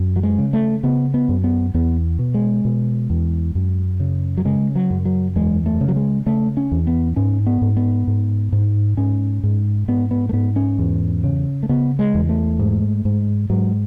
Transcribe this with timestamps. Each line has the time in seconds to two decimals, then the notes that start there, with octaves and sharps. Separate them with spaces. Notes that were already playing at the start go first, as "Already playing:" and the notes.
Already playing: F#2
0.16 F#3
0.23 G#3
0.39 C#3
0.53 A3
0.83 C#3 B3
1.14 B3
1.29 F#2
1.44 B3
1.74 E2 B3
2.19 B2
2.34 G#3
2.65 B2
3.10 E2
3.55 F#2
4.00 C#3
4.37 F#3
4.45 C#3 G#3
4.76 F#3
4.90 F#2
5.05 F#3
5.36 E2 G#3
5.66 A3
5.81 C#3
5.88 F#3
5.96 G#3
6.26 C#3 A3
6.57 C#4
6.71 E2
6.87 B3
7.16 G#2 C#4
7.47 B3
7.62 G#2
7.77 B3
8.07 G#2
8.52 G#2
8.97 G#2 C#4
9.43 G#2
9.88 G#2 B3
10.11 B3
10.29 A3
10.33 G#2 B3
10.56 C#4
10.79 E2
11.24 C#3
11.63 A3
11.69 C#3 B3
11.99 G#3
12.14 E2
12.29 A3
12.59 G#2
13.05 G#2
13.50 G#2 F#3